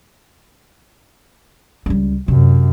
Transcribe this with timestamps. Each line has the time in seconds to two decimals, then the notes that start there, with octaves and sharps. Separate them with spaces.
1.86 C#2 G3
2.28 F#2 C3